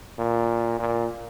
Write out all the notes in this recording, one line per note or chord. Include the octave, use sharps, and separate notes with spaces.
A#2
A#2